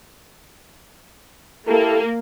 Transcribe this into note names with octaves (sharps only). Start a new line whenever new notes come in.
A#3 E4 G4 A4